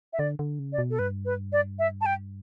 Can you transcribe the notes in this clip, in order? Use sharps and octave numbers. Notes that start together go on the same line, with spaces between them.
E5
D3 D5
D3
C#3
D5
B2
A4
G2 B4
B4
D5
E5
A5
G5